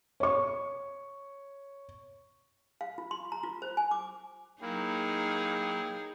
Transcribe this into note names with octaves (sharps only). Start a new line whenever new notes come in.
C#5 C#6
F5
F4
C6
A#5
F4
C5
G#5
D6
F#3 A#3 D#4 E4 G#4 G5